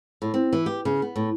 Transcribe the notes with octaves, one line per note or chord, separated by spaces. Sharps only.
A2
C4
E3
G4
C#3
B3
A2